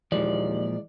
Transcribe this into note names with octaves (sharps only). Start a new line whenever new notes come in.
D#2 A#2 E3 F3 G#3 D5